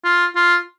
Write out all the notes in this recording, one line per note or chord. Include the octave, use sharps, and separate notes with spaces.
F4
F4